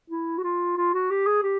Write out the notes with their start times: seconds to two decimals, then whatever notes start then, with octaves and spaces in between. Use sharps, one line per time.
0.10 E4
0.38 F#4
0.43 F4
0.77 F4
0.93 F#4
1.10 G4
1.26 G#4
1.42 G4